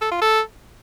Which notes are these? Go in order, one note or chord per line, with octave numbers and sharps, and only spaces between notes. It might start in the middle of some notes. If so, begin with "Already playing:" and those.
A4
F4
A4